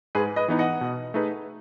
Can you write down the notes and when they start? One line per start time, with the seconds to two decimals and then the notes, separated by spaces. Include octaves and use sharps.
0.15 G#2 G#4 B4
0.36 B4 D#5
0.48 E3 B3 D#4
0.59 D#5 F#5
0.81 B2
1.14 A3 D#4 G#4 B4